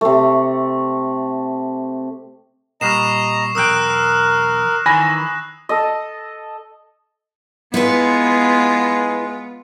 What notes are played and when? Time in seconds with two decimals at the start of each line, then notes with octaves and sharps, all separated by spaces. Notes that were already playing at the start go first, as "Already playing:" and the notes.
0.01 C3 A3
2.81 A#2 G3 D#5 A#5 C#6 C7 E7
3.55 B1 E2 A#4 G5 D#6 E6 F#6
4.86 D#3 E3 G#5 B5 A#6
5.69 A4 D#5
7.74 G#3 B3 E4 F4 B4